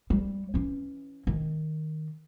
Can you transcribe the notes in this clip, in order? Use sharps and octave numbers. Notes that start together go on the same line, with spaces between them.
G3
E3 C#4
D#3